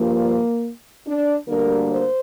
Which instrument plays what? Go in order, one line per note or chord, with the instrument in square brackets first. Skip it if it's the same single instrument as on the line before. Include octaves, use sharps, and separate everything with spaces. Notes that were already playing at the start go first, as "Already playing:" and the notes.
Already playing: [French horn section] G2 F3 A#3
D4
D2 D3 G3 A#3 A#4
C5